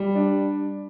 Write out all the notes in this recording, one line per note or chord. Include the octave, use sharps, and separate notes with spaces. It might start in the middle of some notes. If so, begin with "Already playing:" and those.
Already playing: G3
D4